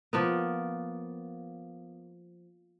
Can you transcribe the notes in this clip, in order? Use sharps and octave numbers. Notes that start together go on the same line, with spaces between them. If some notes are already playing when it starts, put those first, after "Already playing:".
F3 A#3 B3